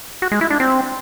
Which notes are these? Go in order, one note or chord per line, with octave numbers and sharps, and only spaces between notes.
F#4
G#3
E4
D4
C4